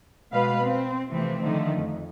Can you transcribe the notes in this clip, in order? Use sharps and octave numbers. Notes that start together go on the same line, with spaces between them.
B2 G#3 B4 F5
C4
C3 E3 F3 A3 C4
D3 D#3 F3 A3
F2